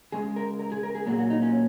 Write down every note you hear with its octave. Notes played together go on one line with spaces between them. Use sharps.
C#3 G#3 G#4
A#4
A#4
G#4
A#4
G#4
A#2 F#3 A#3 G#4
F#4
D#4
C#4